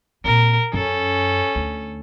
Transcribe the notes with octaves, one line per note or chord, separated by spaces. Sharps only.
A#2 C4 A#4
F#2 C#4 A4
D2